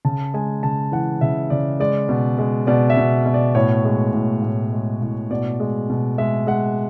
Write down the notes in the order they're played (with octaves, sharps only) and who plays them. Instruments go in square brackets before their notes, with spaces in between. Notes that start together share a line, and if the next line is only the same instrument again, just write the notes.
[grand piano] C#3 A5
G#3 G#5
C#3 A5
E3 F#5
C#3 E5
C#3 D5
G#3 D5
B2
G#3
B2 D5
E5
B2
B2
D5
A2 C#5
G#3
A2
A2
G#3
A2
B2 D5
G#3
B2
G#3 E5
G#3 F#5